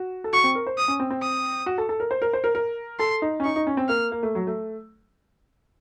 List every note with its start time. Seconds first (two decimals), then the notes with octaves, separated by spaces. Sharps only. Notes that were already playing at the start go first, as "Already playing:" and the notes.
Already playing: F#4
0.24 A4
0.33 F#4 C#6
0.44 C4
0.55 A#4
0.67 C5
0.78 D#6
0.88 C#4
1.00 C4
1.10 C4
1.22 D#6
1.66 F#4
1.78 A4
1.89 A4
2.00 A#4
2.11 C5
2.22 A#4
2.33 C5
2.44 A#4
2.55 A#4
2.99 A4 C6
3.22 D#4
3.40 C#4
3.44 D#4 C#6
3.56 D#4
3.67 C#4
3.77 C4
3.89 A#3 F6
4.12 A#3
4.23 A3
4.35 F#3
4.47 A3